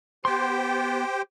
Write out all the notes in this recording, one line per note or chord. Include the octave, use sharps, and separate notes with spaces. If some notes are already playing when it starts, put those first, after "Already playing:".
B3 G4 C5 G5 C6